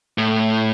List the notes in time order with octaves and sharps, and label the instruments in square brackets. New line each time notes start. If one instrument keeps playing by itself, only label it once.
[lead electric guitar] A2